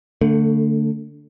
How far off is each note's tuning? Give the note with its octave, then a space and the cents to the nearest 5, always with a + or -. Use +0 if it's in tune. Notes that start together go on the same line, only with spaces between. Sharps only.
D3 +0 A3 +30